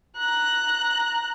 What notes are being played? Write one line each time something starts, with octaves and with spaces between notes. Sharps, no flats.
A#5 F#6